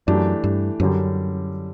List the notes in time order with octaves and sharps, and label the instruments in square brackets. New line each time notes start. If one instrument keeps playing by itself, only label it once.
[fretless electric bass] F#2 [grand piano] E3 A3 D4 G4 D5
[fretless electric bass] G2
[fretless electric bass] F#2 [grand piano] D3 G3 C#4 G4